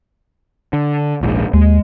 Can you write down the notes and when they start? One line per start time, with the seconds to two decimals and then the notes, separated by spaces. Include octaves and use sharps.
0.73 D3
1.21 D#1 A#1 G#2
1.54 D#2 G#3